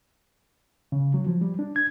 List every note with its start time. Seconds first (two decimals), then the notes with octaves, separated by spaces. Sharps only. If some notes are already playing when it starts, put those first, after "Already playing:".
0.92 C#3
1.14 F#3
1.27 F3
1.41 G3
1.59 D4
1.76 G#6